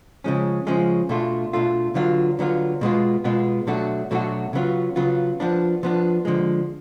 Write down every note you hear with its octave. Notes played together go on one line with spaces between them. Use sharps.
C#3 F3 G#3 C#4
C#3 F3 G#3 C#4
B2 A3 D4 F4
B2 A3 D4 F4
D3 F#3 B3 F4
D3 F#3 B3 F4
B2 G#3 B3 F4
B2 G#3 B3 F4
B2 F#3 A3 D4 F#4
B2 F#3 A3 D4 F#4
C#3 F#3 B3 F4
C#3 F#3 B3 F4
F3 B3 D4
F3 B3 D4
D3 F3 G#3